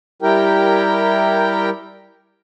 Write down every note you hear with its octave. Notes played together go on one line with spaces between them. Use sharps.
G3 E4 G4 A#4 G5